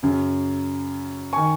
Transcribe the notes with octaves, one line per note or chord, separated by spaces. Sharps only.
F#2 C#3
D#3 G#5 C#6